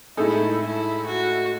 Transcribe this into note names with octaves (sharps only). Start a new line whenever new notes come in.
A2 G#3 D#4 E4 A4
E4
F#4